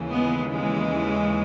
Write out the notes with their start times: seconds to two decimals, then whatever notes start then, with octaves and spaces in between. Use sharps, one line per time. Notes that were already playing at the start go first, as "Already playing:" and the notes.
Already playing: D#2 C#3 E3
0.11 G#3 B3
0.53 E3 G#3